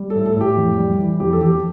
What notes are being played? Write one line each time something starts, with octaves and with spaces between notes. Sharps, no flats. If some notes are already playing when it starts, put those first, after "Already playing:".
Already playing: G3
A4
A2
A4
A2 G4
F2
G3
E3
F2 G4
A4
F2 G4